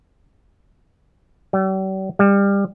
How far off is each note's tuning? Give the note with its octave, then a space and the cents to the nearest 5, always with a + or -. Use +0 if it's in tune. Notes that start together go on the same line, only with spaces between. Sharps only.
G3 -45
G3 +25